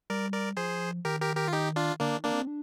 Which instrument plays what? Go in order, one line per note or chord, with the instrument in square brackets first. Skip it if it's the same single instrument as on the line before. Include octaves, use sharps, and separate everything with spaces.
[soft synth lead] G3 [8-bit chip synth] A#4 D5
[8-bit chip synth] A#4 D5
[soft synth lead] F3 [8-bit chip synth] G#4 C5
[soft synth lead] D#3 [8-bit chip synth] G4 A#4
[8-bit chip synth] G4 A#4
G4 A#4
F4
D#4 G4
D4 F4
[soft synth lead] D3 [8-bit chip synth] A#3 D4
[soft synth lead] D#3
[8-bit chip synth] A#3 D4
[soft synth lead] C4
D4